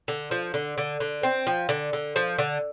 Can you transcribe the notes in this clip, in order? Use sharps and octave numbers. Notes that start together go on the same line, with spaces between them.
D3
F3
D3
D3
D3
C4
F3
D3
D3
F3
D3